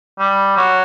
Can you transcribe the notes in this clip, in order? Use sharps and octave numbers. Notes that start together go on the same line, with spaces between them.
G3
F#3